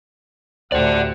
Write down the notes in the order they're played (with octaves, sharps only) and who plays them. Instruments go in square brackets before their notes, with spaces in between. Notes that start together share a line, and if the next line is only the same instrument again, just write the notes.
[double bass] D2 A2 [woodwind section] C3 F#5 [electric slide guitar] A4 D5